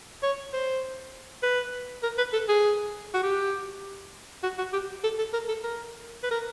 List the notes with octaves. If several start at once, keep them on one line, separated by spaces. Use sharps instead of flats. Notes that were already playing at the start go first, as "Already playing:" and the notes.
C#5
C5
B4
A#4
B4
A4
G#4
F#4
G4
F#4
F#4
G4
A4
A4
A#4
A4
A#4
B4
A#4